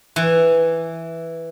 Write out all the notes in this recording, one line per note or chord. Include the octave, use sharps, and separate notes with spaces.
E3